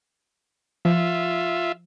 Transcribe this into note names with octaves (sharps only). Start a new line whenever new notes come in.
F3 F4 E5